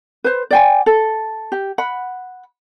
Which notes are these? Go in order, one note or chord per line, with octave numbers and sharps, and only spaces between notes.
B4 C5
D5 G5 G#5
A4
G4
F#5 B5